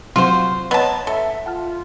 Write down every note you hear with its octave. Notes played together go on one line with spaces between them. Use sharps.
C3 F#3 F4 F#4 C5 F5
B3 C#5 D#5 A5 A#5
A4 E5
F4 F#5 A5 F6